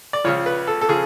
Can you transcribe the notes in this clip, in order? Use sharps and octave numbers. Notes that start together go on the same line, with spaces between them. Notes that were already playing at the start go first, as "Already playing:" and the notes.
D5
C#2 C#3 F3 C#5
B4
A4
A4
C#3 F3 G#4